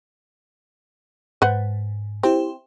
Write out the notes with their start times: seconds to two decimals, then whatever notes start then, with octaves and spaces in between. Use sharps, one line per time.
1.42 G#2 B4 C5 F#5
2.23 C4 E4 G4 C5